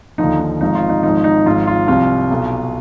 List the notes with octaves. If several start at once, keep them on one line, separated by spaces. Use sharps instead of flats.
D#2 D3 F3 D#4
D#4
G#1 G#2 F3 D#4
F4
D#4
G#1 G#2 F3 D#4
D#4
G#1 G#2 F3 F4
F4
C2 C3 F3 F4
B1 B2